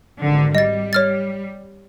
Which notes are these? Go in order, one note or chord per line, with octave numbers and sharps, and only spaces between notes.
G#1 D3
G3 D#5 A6
C#5 F6 A6